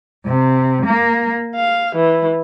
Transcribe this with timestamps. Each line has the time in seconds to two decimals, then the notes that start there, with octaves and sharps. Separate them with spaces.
0.25 C3
0.86 A#3
1.55 F5
1.96 E3